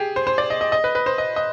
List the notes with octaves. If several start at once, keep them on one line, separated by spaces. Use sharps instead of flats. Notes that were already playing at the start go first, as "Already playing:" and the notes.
Already playing: G4 G#4
C5
C5
D5
D#5
D#5
D#5
B4
B4
C5
D#5
D#5